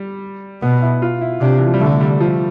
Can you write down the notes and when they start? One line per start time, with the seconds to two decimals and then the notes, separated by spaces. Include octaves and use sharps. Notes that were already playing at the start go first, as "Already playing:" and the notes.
Already playing: G3
0.62 B2 B3
0.82 E4
1.02 F4
1.21 E4
1.41 C3 D4
1.59 E3
1.66 F3
1.74 G3
1.80 D3 A3
2.00 G3
2.21 F3